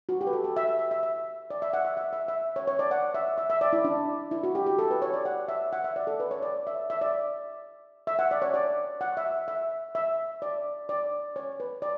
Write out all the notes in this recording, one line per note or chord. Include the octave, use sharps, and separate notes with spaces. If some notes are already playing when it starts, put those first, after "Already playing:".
F#4
G4
B4
A4
A4
E5
E5
E5
E5
E5
D5
E5
F#5
E5
E5
E5
E5
C#5
C#5
D5
F#5
E5
E5
E5
D5
E4
D4
E4
F#4
G4
G4
A4
B4
C#5
D5
F#5
E5
F#5
E5
D5
A4
B4
C#5
D5
E5
E5
D5
E5
F#5
D5
C#5
D5
F#5
E5
E5
E5
D5
D5
C#5
B4
D5